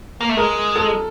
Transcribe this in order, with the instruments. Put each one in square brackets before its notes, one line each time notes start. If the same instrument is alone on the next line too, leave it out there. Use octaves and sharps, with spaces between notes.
[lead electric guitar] A#3
A3
[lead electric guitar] G#3 [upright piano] A#4
[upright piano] A4